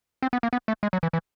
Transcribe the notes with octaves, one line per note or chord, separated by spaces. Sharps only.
C4
B3
A#3
B3
A3
G#3
F#3
E3
E3